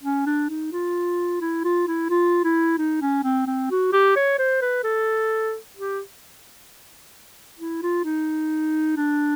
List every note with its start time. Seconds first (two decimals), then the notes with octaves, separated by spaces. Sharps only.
0.04 C#4
0.26 D4
0.49 D#4
0.72 F4
1.41 E4
1.64 F4
1.87 E4
2.10 F4
2.44 E4
2.78 D#4
3.01 C#4
3.24 C4
3.47 C4
3.71 F#4
3.93 G4
4.16 C#5
4.39 C5
4.62 B4
4.84 A4
5.76 G4
7.58 E4
7.83 F4
8.05 D#4
8.97 D4